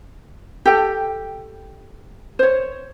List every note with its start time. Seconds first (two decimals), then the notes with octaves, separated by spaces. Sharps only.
0.66 G4 A4 G5
2.39 C5 C#5